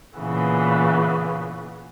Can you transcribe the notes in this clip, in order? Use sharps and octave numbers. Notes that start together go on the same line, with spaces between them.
A#2 C#3 E3 B3